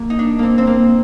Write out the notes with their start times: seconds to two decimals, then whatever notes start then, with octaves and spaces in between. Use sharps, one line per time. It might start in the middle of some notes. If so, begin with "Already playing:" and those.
Already playing: A#3
0.10 D#4
0.19 D4
0.39 A#3 C4
0.58 C4
0.67 A#3